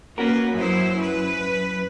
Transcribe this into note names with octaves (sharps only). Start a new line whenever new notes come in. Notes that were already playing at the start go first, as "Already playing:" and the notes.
A#3 C#4 F#4 A#4 B4
F#2 F#3 E4 C5
B4